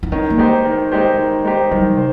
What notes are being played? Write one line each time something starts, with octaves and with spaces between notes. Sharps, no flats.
D#4
D#3 C#4
A#3
G#3 D#4 G4 C5
D#3
G#3 D#4 G4 C5
D#3
G#3 D#4 G4 C5
D#3 G3
C3
C5